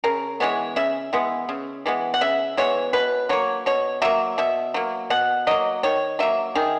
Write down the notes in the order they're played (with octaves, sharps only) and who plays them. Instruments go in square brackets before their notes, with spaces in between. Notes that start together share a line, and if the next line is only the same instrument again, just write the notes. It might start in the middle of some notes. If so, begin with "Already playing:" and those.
[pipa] C#3 A#4
E3 G#3 B3 C#5
C#3 E5
E3 G#3 B3
C#3
E3 G#3 B3
F#5
C#3 E5
E3 G#3 B3 C#5
B2 B4
F#3 A#3 C#5
B2 C#5
F#3 A#3 E5
B2 E5
F#3 A#3
B2 F#5
F#3 A#3 D#5
D#3 C#5
F#3 A#3 E5
D#3 G#4